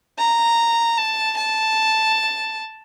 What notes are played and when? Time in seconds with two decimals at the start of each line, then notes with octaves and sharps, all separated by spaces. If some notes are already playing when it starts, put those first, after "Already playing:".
0.18 A#5
0.97 A5
1.36 A5